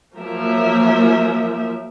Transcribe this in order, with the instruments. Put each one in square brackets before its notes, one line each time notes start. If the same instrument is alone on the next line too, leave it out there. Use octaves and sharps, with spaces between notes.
[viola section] F3 F#3 A#3 A#4 E5